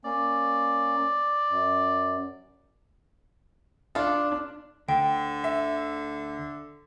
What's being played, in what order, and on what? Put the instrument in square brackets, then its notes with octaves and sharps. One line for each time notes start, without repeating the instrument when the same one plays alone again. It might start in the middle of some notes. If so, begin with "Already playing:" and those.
[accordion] A#3 C#4 [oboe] D5
[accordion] F#2
[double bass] D4 [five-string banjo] F4 A4
[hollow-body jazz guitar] D2 [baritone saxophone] D3 [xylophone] G5
[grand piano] E5